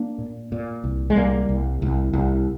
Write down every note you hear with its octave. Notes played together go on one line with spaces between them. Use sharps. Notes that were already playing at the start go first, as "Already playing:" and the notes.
Already playing: A#3 D4
A#2
A#2
C2
G#3
C2 G3 A#3
C2
C2
C2